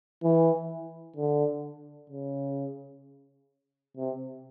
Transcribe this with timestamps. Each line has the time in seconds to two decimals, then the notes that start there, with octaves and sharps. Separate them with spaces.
0.23 E3
1.16 D3
2.10 C#3
3.97 C3